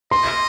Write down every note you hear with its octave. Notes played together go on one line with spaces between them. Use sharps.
D#5 C6